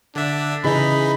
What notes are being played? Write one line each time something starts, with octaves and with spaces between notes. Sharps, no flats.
D3 D4 E5
C#3 E3 D#4 G#4 D#5 B5